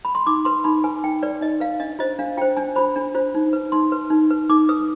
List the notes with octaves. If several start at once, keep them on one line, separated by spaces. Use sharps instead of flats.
B5
C6
D#4 D6
B4 C6
D#4 B5
B4 G#5
D#4 G5
B4 D5
D#4 D#5
B4 F5
D4 D#5
F4 C5 D#5
D4 F5
F4 C5 G5
D4 G#5
F4 C5 B5
D4
F4 C5
D#4
B4
D#4 C6
B4
D#4
B4
D#4 D6
B4 D#6